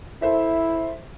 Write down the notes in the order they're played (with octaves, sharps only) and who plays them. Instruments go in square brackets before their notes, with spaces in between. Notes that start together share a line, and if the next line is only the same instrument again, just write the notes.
[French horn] E4 [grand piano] A4 C5 E5